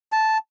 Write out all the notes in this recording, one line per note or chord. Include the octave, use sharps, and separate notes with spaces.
A5